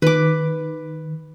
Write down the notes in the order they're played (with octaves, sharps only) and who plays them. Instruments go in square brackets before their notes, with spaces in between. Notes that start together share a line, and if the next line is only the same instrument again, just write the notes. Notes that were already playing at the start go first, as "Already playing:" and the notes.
[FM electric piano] D#3 [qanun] B4 D6